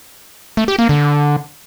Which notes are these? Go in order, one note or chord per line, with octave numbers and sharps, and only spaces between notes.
A3
G4
A#3
D3